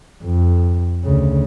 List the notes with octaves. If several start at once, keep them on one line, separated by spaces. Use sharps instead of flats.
F2
D2 C#3